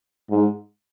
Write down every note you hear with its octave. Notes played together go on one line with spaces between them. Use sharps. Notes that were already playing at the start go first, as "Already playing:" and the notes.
G#2